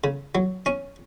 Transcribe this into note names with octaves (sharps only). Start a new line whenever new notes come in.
C#3
F#3
C#4